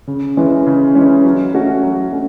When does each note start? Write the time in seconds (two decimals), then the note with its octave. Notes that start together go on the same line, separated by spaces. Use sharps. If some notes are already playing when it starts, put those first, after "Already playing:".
0.07 C#3
0.37 E3 G#3 C#4
0.67 C#3
0.95 E3 G#3 C#4
1.25 F#3
1.54 A3 C#4 F#4
1.83 F#3
2.12 A3 C#4